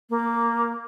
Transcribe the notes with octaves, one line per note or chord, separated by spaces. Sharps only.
A#3